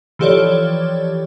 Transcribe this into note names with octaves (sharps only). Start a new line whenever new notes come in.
E3 F3 G4 A4 C#5 D5